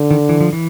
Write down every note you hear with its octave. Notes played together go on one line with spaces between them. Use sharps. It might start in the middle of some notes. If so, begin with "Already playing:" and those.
Already playing: D3
D#3
E3
F3
E3